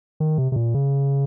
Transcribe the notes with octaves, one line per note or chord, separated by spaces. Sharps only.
D#3
C3
C3
A#2
C#3